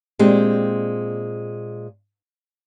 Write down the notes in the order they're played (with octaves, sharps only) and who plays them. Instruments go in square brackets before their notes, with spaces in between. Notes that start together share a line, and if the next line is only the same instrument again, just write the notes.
[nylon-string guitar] A#2 G#3 C4 D4 G4